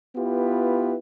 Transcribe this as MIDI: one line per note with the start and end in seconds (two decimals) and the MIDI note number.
0.16 0.94 59
0.16 0.94 64
0.16 0.94 65
0.16 0.94 67
0.16 0.94 71